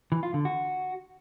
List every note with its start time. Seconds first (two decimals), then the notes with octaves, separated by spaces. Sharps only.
0.12 E3
0.23 F4
0.34 D3
0.45 F#4